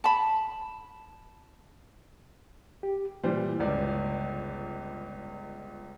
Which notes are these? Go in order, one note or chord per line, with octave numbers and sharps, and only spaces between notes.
A5 B5
G4
A#2 E3 G3 C5
G1 C#2 D5